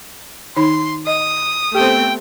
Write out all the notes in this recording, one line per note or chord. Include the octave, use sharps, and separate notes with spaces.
D#3 D#4 B5 C6
D#5 D#6
A3 B3 C4 G4 G5